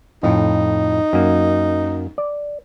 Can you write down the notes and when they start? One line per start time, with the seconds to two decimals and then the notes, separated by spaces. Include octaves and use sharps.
0.23 F2 A2 D#4
1.13 F#2 A#3
2.18 D5